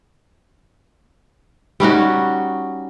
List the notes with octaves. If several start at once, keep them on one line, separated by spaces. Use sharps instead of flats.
G3 C#4 D#4 F#4